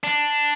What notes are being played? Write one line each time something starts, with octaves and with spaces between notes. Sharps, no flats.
D4